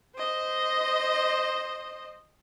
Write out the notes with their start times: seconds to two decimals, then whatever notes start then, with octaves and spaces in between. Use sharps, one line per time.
0.16 C5 D#5